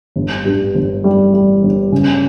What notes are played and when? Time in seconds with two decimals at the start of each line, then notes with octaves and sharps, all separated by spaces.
0.16 G1
0.45 G2
0.75 G1
1.04 G3
1.33 G3
1.63 G1
1.92 C#3